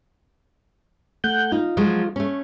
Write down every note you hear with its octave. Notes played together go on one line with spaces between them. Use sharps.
A3 F#5 G6
D#4 F4
F3 F#3 G#3
A3 C#4